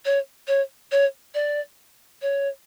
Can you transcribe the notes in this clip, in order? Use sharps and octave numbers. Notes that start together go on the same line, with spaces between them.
C#5
C#5
C#5
D5
C#5